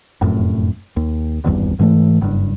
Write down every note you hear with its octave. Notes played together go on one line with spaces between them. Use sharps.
F1 F#2 A2
D#2
D#1 G#1 E2 G2
G#2 E3 G#3 A3
F#1 G2